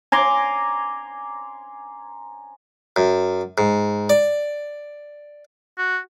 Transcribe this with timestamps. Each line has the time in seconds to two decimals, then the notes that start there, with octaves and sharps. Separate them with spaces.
0.12 G#5 A#5 C6 D6
2.96 F#2
3.58 G#2
4.10 D5
5.78 F#4